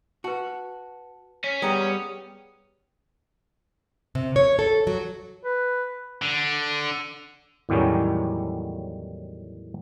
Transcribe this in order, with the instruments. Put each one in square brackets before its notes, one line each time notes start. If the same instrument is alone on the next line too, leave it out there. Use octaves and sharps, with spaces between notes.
[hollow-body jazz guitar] F#4 [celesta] B4 A5
[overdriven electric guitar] C#4 [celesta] B6
[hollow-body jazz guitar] G3 B3 A#5 [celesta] G#4 G5 D#6
[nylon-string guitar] C3
C#5
A4
F#3
[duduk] B4
[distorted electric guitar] D3
[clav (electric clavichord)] E2 A2 D#3 F#3 G3 C#4